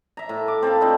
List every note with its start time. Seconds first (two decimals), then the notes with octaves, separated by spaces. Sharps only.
0.17 E5 A#5
0.29 A2
0.48 D6
0.62 C4 A4 F5 B5
0.81 C4 D4 D#4 F4